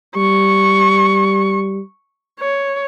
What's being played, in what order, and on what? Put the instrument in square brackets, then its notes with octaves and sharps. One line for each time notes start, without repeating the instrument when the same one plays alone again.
[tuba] G3 [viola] C#6
[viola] C#5